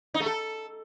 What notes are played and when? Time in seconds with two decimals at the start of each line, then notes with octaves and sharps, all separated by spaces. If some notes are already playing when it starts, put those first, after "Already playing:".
0.14 D#4
0.20 A3
0.26 A4